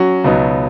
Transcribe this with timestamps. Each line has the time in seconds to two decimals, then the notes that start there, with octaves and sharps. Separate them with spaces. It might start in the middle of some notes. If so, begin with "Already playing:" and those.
Already playing: F#3 C#4 F#4
0.24 C#2 B2 F#3 B3 D#4